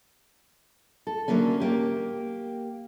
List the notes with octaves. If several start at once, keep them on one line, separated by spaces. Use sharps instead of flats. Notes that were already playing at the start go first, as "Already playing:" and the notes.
A4
D3 F#3 A3 A#3 C#4
A#3 G4